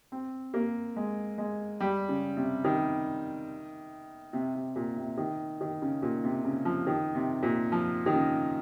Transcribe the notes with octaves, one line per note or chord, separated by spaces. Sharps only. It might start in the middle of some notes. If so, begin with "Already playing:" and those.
C4
A#3
G#3
G#3
G3
C#3
C3
D#3
C3
C3
A#2
C3
D#3
D#3
C#3
A#2
C3
C#3
F3
D#3
C3
A#2
F3
D#3
C#3